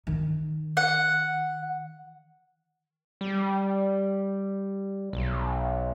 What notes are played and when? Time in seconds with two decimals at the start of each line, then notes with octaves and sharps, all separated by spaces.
0.07 D#3
0.77 F#5
3.21 G3
5.13 B1